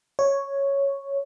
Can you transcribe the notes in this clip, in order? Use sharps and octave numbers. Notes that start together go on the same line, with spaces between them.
C#5